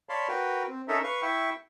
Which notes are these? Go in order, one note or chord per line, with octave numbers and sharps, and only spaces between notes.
C#5 D5 F5 A5 B5 C6
F#4 A#4 B4 G5
C4
C#4 D#4 A4 A#4 E5
B4 F5 C#6
E4 E5 G5 C#6